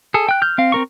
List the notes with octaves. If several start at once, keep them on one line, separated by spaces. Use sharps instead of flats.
G#4 A4
G5 F#6
F6 G6
C4 F5
C4 A#4 C#6